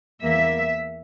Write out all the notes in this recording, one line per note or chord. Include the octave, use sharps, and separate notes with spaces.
E2 E3 A#3 E5